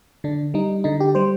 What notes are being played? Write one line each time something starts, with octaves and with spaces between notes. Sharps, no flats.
D3 D4
G3 D#4
D3 D#4
G4
G3 C5